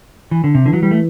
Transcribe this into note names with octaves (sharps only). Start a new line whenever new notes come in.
E3
D3
C3
D3 E3
F#3
G3
A3